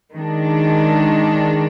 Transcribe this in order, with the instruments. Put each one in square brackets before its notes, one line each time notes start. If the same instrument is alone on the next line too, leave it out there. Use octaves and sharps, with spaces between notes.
[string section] D#3 G#3 D4